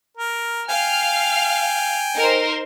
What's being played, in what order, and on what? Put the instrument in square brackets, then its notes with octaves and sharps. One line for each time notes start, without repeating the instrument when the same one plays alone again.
[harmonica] A#4
[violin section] F5 F6 [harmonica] G5 G#5
[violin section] D#4 A#4 C5